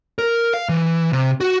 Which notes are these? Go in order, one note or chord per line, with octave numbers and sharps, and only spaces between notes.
A#4
F5
E3
C3
F#4